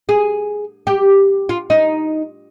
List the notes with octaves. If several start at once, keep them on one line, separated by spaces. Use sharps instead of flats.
G#4
G4
F4
D#4